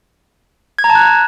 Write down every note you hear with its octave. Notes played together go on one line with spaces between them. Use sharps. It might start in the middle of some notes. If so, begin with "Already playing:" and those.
G#6
A#5
A5
F#6